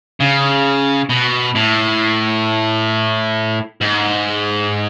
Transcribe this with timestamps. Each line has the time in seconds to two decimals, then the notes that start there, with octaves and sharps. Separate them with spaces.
0.20 C#3
1.09 B2
1.55 A2
3.81 G#2